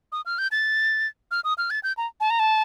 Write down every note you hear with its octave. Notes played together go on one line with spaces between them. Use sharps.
D#6
F6
G6
A6
F6
D#6
F6
A6
G6
A#5
A5
A#5
A5